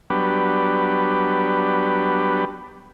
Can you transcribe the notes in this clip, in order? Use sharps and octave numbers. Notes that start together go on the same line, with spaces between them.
F#3 G3 B3 D4 G4 B4